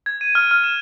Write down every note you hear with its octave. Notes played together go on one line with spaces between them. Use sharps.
G#6
D#7
F6
F6
E7